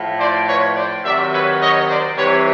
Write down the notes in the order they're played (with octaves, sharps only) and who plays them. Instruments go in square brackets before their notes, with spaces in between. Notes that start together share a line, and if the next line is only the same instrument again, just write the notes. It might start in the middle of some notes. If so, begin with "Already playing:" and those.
Already playing: [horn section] A2 F3
C5 D5
B4 C#5
C5 D5
C3 D#3 F#3 D5 E5
B4 C#5
C#5 D#5
C5 D5
C3 E3 G3 B4 C#5